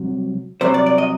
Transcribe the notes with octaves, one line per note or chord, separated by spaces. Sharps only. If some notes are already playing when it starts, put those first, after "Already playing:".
Already playing: C2 C3 F#3
C2 C3 F#3 C5
D5
D5
D#5